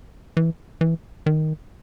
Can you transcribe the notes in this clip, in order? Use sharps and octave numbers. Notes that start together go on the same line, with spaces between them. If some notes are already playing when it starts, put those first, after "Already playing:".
E3
E3
D#3